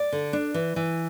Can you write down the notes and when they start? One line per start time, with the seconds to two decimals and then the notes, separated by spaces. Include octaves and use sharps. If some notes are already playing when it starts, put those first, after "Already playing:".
Already playing: D5
0.12 D3
0.33 D4
0.54 E3
0.76 E3